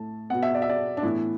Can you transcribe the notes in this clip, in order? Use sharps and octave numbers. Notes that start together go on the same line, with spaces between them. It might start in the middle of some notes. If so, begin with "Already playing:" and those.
Already playing: A2 A3 A5
B2 B3 F#5
E5
D5
E5
D5
D4
A2 E3 B3 E4